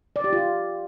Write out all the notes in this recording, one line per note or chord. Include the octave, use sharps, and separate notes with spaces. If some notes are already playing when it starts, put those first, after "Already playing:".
D5
G4
F4